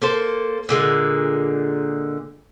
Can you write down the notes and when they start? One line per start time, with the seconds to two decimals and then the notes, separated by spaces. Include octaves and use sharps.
0.02 A#3 A4 C5
0.69 A#2 D3 G#3